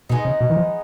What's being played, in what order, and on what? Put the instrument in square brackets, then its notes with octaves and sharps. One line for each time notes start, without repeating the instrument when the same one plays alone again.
[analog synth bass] B2 [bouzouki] G#3 B3 D#4
[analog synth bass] C#3
B2
E3
F3